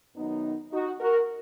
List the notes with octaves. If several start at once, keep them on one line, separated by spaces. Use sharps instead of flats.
F#2 D#3 F#3 B3 D#4
D#4 F#4
F#4 A#4